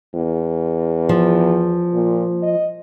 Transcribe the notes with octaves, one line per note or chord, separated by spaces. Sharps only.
E2
F3
A#2
D#5